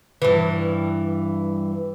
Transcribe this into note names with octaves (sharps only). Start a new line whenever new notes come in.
G2 E3